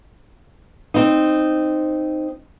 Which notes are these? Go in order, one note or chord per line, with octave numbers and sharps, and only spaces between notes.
C4 D#4